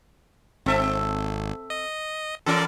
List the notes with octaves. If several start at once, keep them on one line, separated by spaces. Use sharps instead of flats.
G#1 C4 A4 E5
D#5
E3 C#4 A4 A#4 D5